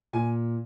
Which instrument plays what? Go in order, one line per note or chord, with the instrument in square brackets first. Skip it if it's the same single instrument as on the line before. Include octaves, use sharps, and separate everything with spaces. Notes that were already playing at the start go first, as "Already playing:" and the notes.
[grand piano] A#2 G#5